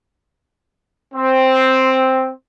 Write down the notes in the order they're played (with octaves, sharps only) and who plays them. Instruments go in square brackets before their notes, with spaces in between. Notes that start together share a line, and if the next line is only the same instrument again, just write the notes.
[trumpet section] C4